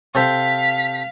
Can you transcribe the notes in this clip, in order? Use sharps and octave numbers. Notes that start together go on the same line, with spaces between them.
C3 A4 C5 F5 B6